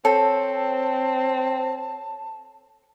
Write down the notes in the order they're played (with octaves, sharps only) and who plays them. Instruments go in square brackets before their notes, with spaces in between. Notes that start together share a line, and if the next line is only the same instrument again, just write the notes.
[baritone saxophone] C4 [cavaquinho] A4 [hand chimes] C#5 [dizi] A5